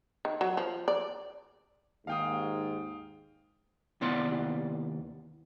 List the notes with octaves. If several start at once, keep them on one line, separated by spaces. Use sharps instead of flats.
D#3
F#3
F3
D5
D#2 G#2 F5 G5 D#6
D#2 C3 B3 E4 D5 C6